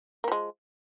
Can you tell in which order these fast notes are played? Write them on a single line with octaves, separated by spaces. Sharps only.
A#3 F3 G#3